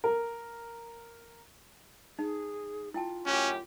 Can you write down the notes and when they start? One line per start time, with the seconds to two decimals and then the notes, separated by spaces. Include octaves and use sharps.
0.04 A#4
2.19 D#4 G#4
2.94 E4 F4 G5 A5
3.26 F#2 A2 C#4 G4